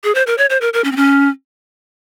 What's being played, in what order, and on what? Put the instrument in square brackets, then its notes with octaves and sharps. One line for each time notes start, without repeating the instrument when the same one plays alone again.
[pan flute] G#4
C5
A#4
C#5
C5
A#4
A#4
C#4
C4
C#4